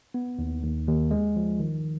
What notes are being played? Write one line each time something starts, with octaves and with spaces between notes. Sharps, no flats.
B3
D#2
D#2
D#2
G#3
F3
D#3